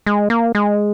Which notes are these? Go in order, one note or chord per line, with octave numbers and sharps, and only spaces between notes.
G#3
A#3
G#3